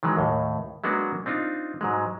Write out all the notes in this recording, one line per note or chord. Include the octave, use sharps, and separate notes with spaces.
D#3 E3 F#3 G#3
D#2 A2
F#3 G#3 A#3 B3 D4 F#4
C4 D4 D#4 F4
G#2 F#3 G#3